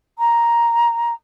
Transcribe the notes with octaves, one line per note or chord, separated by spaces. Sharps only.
A#5